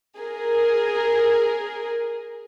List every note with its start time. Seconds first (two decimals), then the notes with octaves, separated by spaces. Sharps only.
0.18 G#4 A#4